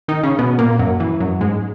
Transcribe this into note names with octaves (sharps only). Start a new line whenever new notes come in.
D#3 D#4
C#3 C#4
B2 B3
A#2 A#3
F#2 F#3
E3
F#2 F#3
G#2 G#3